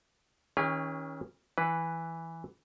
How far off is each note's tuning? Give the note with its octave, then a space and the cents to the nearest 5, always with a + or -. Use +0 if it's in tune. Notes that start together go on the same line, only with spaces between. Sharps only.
D#3 +40 C#4 +0 G#4 -45
E3 +0 B4 +0